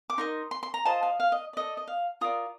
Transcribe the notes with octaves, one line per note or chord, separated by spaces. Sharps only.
D6
D#4 A#4 D#5 C6
C6
C6
A#5
F4 C5 D#5 A5
F5
F5
D#5
A4 D5 D#5
D#5
F5
F4 A#4 D5 D#6